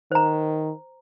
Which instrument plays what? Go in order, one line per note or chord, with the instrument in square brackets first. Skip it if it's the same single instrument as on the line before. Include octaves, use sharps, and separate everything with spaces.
[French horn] D#3 [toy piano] C5 A#5